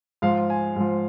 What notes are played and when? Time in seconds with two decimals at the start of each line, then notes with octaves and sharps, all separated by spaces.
0.22 G#2 F3 F5
0.50 G#5
0.76 G#2 F3